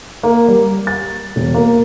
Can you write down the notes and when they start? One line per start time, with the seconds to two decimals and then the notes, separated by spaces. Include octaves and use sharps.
0.23 A#3
0.48 G3
0.87 A6
1.36 E1
1.54 A#3